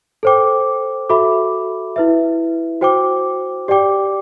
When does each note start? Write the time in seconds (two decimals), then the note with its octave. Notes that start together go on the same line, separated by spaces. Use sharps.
0.23 A4 C5 G5 D6
1.09 F#4 A4 E5 B5 D6
1.96 E4 B4 E5
2.81 F#4 C5 G5 D6
3.68 G4 D5 G5 D6